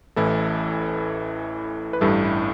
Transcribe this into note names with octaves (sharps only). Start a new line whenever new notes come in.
A1 A2 E3 E4 A4
B4
A1 G2 G3 E4 A4
E4